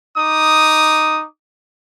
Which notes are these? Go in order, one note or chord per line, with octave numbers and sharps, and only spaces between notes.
D#4 D6 D#6